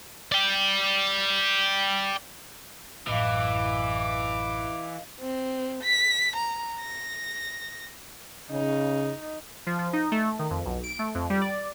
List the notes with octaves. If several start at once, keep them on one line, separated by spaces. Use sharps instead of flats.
D5 G5
A1 F#2 E3 D#5 F5 D6
C4
B6
A#5
A#6
C#3 D#4
F3
F3
D#4
A3
D#3
F2
B1
D7
A3
F2
G3
D5